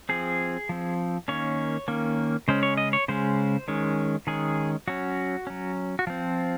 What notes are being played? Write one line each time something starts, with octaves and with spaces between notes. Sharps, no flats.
F3 C4 G#4
F3 C4
D#3 A#3 C#4 C#5
D#3 A#3 C#4
C#3 G#3 C#4 C5
C#5
D#5
C#5
C#3 G#3 C#4 C5
D#3 G#3 C#4
D#3 G#3 C#4 G#4
F#3 C#4 F#4
F#3 C#4
F#4
F3 C4 F4